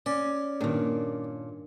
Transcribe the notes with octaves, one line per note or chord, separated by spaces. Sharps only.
C#4 D5
G2 A#2 D#3 D4